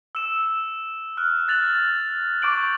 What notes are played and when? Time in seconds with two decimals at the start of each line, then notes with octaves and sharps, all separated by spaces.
0.15 E6 E7
1.17 F6 F#6
1.48 F#6 A6 F7 F#7
2.42 C#6 D6 G6 D7 F#7